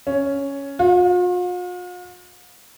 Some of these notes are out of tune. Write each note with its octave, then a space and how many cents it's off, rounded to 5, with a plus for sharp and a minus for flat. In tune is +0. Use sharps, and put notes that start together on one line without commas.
C#4 +5
F4 +45